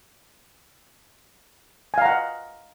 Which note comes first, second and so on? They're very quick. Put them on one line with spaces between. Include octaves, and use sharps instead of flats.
G#5 F5 A#5 F#5 D#5